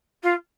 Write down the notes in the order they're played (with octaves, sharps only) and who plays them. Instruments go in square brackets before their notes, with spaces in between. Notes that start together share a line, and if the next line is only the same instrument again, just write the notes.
[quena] F4